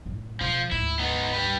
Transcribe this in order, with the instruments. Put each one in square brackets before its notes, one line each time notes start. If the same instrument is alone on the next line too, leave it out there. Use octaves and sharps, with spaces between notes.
[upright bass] F#2 A2
[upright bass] B1 [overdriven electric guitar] F3
[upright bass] D2 G#2 [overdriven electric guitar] E4
[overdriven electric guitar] B3 D#4
G3 B4